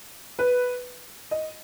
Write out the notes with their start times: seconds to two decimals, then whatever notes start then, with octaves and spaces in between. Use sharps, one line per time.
0.39 B4
1.31 D#5